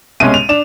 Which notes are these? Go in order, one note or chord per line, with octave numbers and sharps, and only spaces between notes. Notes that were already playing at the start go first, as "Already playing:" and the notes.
C2 B2 G#3 C#4 D#7
F7
D4 E7